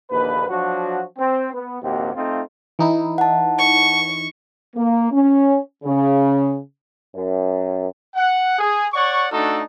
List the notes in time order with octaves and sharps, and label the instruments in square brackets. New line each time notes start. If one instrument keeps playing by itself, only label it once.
[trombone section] A#1 D#2 D3 A#3 B4
F3 F#3 D4 F#4
C4
B3
A#1 D#2 C3 A#3 C4 F#4
A3 C4 D#4 F4
[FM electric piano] E3 D#4 E4
[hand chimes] F#5 A5
[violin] C#6
[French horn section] A#3
C#4
C#3
[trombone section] F#2
[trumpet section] F#5
G#4
C#5 D5 F#5 C#6
A3 D4 D#4 F#4 A4